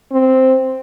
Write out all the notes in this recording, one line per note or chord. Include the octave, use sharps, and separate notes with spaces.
C4